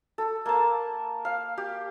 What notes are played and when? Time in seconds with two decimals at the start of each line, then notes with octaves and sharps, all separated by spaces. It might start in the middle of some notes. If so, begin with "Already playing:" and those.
0.18 A4
0.46 A#3 A5
1.25 F5
1.57 G4